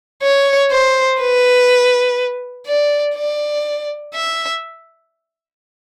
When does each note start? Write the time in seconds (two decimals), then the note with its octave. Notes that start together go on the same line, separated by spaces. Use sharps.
0.23 C#5
0.71 C5
1.20 B4
2.67 D5
3.16 D5
4.14 E5